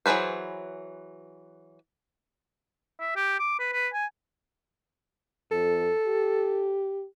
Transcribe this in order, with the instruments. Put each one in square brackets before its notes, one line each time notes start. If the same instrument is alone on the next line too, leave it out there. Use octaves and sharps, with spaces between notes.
[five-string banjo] E3 F#3 G#4 B4 C5
[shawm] E5
G4
D6
B4
B4
G#5
[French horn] F2 [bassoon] A4
[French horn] G4